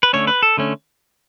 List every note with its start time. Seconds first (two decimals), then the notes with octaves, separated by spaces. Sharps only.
0.03 B4
0.13 D3 A3 C#4 C#5
0.27 B4
0.42 A4
0.57 D3 A3 C#4